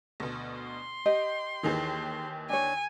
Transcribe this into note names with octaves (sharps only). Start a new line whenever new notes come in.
D2 B2
C6
G4 D#5
D#2 D#3 E3 D#4 G#4
D4 C#5 G#5